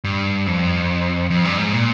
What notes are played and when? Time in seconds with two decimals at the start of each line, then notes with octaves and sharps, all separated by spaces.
0.04 G2
0.47 F2
1.30 F2
1.45 G2
1.59 G#2
1.73 A#2